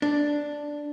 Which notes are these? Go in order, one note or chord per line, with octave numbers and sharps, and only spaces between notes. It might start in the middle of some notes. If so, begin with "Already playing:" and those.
D4